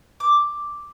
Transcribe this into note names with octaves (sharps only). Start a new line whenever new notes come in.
D6